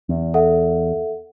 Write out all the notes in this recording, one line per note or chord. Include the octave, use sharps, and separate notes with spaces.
E2
A4 E5 F#5